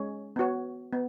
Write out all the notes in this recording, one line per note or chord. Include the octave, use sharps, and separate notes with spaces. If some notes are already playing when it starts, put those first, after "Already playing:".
Already playing: G#3 C#4 G#4 C#5
B3 F#4 C#5
B3